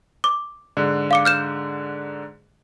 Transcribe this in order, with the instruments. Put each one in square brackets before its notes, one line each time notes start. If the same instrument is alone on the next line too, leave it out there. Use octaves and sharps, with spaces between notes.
[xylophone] D6
[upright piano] G#2 D3
[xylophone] F5 D6 C#7
F6 G6 E7